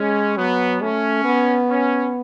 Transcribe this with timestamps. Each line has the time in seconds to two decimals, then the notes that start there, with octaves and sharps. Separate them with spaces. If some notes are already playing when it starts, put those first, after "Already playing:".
Already playing: G#3 C#4
0.37 F#3 B3
0.81 A3 C#4
1.25 B3
1.69 C#4